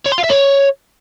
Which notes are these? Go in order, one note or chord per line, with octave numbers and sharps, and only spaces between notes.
C#5
C6
F5
E5
C#5